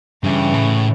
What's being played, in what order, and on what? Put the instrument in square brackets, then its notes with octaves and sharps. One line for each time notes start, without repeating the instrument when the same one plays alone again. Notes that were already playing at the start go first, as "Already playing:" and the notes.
[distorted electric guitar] G2 [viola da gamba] C#3 E3
[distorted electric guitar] A2